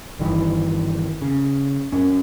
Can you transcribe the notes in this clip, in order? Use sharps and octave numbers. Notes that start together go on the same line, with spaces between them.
G1 G2 D#3 E3
C#3
F#2 C#4